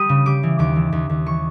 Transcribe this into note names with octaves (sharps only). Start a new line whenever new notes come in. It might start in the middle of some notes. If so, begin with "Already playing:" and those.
Already playing: G3 D#6
C#3
G3 D6
E3
D#2 D6
E3
D#2
D#2
E3 C#6